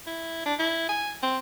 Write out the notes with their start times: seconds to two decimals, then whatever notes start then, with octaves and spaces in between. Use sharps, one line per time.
0.07 E4
0.46 D4
0.59 E4
0.89 G#5
1.23 C4